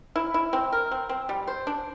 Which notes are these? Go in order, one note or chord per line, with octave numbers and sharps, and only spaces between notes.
E4
E4
C4
A#4
C4
C4
G3
C5
D4